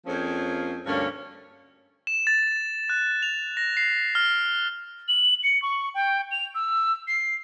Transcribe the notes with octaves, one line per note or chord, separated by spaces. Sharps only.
F2 F3 A#3 C4 C#4 G#4
D2 G2 A3 A#3 C#4
E7
A6
F#6
F7
A#6
C7
F6
F#7
C#7
C#6
G5
F7
E6
C7